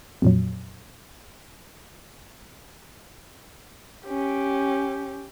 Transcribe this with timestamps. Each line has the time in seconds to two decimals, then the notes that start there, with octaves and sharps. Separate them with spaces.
0.22 F2 A#2 F#3
4.06 C#4 G4